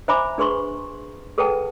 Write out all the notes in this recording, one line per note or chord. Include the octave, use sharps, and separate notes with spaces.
C5 E5 G#5 A#5 B5 D6
D4 G#4 B4 C6 C#6
G#4 A4 B4 F#5 G5 A5